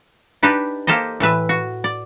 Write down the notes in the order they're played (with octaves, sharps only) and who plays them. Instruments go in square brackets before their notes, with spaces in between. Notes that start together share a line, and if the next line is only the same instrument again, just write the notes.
[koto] D4 D#4 G4 B4 D5
A#3 G4 A4 C5 D#5
A2 E3 B4 E5
F#4
D5